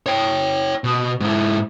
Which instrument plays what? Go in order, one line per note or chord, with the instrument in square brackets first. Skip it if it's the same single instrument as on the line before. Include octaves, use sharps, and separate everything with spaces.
[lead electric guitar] C#5 G5
B2
G#2 E4